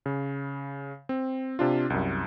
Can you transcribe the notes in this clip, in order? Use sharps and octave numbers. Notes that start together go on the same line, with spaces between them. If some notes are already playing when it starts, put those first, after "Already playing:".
C#3
C4
C3 D4 F4
C2 F#2